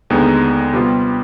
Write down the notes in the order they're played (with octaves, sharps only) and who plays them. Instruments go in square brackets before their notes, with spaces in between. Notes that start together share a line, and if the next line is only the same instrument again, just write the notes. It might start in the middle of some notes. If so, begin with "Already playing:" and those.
[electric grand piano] D#2 D3 G#3 B3 D#4
C3 G3 B3 F4